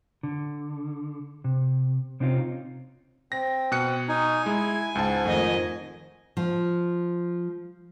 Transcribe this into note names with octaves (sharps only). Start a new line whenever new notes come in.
D3
C3
C3 C4 C#4 D#4 F4
C4 A#6
B2 F#6 C#7
D#4 G#5
G#3 E4
C#2 G#2 A5
F2 D#3 A3 D#5
F3